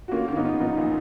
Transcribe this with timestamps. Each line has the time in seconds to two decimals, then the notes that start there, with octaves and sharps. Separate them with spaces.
0.08 F#4
0.11 A#3 C#4 F4
0.28 D#3 C#4
0.36 B3 D#4
0.45 F4
0.60 F3 B3 D#4
0.77 A#2